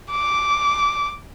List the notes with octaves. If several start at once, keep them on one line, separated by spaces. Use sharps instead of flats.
D6